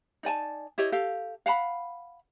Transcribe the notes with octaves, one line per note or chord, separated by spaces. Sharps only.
D#4 D5 G#5 A5
E4 G4 C#5 D#5
G4 A4 F5
F5 F#5 A5 B5